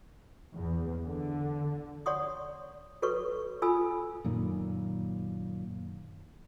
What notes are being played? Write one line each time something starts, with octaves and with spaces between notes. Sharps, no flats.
E2
D3
C#5 D5 F#5 C6 C#6 D#6
F#4 A4 B4 C#5 C#6
F4 A4 G#5 B5 E6
F#2 A#2 D#3